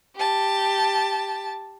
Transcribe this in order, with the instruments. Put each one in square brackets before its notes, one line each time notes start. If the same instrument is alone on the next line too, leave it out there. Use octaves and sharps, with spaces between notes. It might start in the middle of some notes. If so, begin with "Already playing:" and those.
[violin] G4 A5